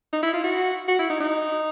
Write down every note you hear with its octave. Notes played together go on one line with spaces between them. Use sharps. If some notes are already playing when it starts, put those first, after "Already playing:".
D#4
E4
F4
F#4
F#4
E4
D#4
D#4